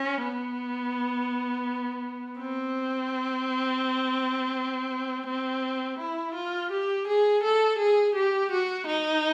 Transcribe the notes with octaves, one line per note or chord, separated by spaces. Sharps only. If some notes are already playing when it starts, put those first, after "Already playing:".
Already playing: C#4
B3
C4
C4
E4
F4
G4
G#4
A4
G#4
G4
F#4
D#4